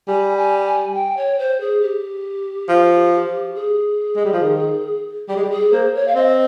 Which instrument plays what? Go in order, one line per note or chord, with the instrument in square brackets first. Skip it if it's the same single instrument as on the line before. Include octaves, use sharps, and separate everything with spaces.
[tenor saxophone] G3 [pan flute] G#5
[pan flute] G#5
G#5
G5
C#5
C5
G#4
G4
[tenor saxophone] F3
[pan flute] G#4
[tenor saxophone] G#3
G3
F3
D#3
[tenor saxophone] G3 [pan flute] G4
[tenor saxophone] G#3
G3
[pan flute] G#4
[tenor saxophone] A#3 [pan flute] C5
[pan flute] C#5
F5
[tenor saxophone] C4 [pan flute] D#5